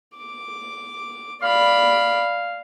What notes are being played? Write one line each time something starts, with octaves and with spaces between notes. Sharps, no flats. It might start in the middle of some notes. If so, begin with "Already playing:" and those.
D6
D5 F5 B5